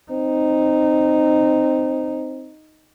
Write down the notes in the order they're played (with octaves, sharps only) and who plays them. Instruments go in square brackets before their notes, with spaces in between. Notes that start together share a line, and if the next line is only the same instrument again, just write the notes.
[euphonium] C4 [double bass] D#4